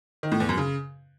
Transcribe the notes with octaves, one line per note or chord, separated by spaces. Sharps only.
D#3
A2
E2
F#2
C#3